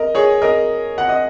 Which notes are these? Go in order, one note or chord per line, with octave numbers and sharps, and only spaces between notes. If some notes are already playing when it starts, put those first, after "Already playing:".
Already playing: A#4 D#5
G#4 C#5
A#4 D#5
F#5
D#5